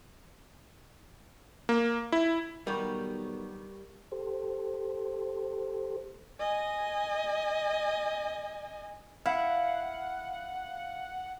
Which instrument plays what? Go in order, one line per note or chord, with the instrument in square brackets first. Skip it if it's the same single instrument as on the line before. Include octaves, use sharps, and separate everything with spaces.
[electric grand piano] A#3
E4
[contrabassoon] B1 [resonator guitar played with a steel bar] D#3 B3 [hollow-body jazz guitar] G3 [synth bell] A#4 C#6
[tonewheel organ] G4 A4 C5
[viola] D#5 G#5
[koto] E4 [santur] F5 [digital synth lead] F#5